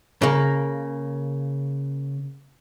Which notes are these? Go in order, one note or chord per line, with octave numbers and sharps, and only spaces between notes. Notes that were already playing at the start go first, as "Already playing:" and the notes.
C#3 A#3